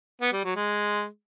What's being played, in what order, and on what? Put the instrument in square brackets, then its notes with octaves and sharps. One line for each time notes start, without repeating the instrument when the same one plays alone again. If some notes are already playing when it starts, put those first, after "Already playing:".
[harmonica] B3
G3
F#3
G#3